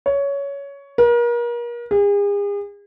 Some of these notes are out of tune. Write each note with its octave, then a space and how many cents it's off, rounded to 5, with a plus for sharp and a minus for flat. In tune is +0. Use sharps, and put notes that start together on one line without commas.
C#5 +15
A#4 +35
G#4 -40